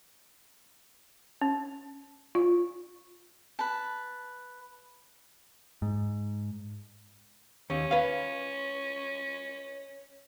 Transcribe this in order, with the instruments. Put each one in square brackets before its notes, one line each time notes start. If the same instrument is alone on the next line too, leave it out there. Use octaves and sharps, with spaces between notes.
[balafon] C#4
F4
[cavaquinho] B4 A5
[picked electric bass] G#2
[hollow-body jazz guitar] D#2 [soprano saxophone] C#4
[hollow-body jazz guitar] B4 F5